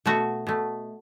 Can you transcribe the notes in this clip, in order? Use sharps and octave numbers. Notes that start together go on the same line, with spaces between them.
B2 A3 F#4
B2 A3